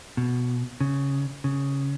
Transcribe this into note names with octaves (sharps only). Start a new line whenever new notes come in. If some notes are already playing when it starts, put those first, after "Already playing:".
B2
C#3
C#3